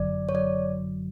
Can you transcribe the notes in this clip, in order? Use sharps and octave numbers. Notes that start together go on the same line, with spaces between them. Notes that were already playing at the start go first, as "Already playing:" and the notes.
Already playing: G1 F#2 D3 F#3 D5
C#5
D3 F#3 D5